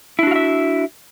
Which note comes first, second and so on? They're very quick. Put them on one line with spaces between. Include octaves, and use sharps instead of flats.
E4 D4 F#4 F5 E5